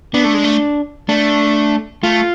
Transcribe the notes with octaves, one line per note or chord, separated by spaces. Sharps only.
B3 D4
A3
G#3
A3
A3 D4
A3 F4